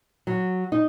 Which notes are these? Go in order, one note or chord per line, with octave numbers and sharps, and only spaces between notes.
F#3
D#4